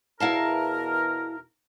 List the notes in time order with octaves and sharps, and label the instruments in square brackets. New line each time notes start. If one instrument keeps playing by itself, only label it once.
[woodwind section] E2 B2 A#4 [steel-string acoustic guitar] E4 F5 A5